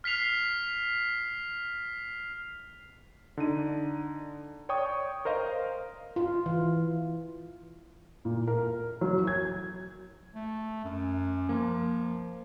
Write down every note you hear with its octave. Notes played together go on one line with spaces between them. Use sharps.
F6 B6 C7 F7
D3 D#4 D#7
C#5 D5 G5 C#6 D#6
A#4 C5 D#5 F5
F4
E3
A#2
A#4
F#3
G#6
A3
F#2
F3 A#3